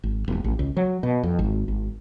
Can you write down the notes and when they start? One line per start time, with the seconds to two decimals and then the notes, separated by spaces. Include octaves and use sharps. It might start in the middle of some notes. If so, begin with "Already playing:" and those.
0.04 G#1
0.28 E1
0.44 A1
0.59 C#2
0.77 F#3
1.03 B2
1.23 F2
1.39 G#1
1.68 G#1